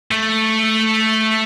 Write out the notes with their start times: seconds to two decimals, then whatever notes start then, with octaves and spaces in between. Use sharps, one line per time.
0.11 A3